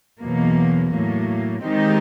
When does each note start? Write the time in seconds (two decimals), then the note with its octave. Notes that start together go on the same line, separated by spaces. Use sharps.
0.20 E2 B2 F#3 A#3
0.91 A2 F#3 A#3
1.63 D#3 G#3 C4 D#4 G4